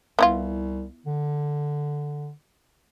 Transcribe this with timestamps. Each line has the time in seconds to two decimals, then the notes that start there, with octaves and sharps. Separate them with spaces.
0.19 C2 B3 E4 F4
1.06 D3